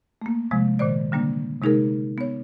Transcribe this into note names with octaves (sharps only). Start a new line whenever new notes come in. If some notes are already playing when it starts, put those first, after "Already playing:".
A3 A#3
C3 F3 G#3
A#2 D#3 C5 D5
D3 G3 A#3 D4
C3 G#3 D#4 G#4 A#4
B3 C#5